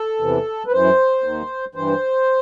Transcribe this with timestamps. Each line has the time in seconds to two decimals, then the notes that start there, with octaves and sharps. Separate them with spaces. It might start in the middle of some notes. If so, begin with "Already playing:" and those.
Already playing: A4
0.20 E2 C3 E3
0.67 B4
0.72 F#2 E3 C5
1.24 D#2 D#3
1.75 G2 E3 C5